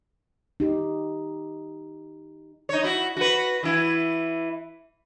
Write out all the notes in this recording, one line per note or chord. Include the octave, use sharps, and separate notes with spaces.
D#4 G4
D#4 C#5
E4 F#4
F#4 B4
E3 E4